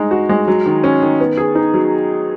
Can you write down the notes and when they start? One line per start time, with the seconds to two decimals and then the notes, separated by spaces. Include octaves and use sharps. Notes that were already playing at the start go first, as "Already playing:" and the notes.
Already playing: G#3 D#4
0.11 F#4
0.29 G#3
0.48 F#3
0.66 D#3
0.84 C#4
1.02 D#3
1.20 B3
1.37 G#4
1.55 D#4
1.73 F#3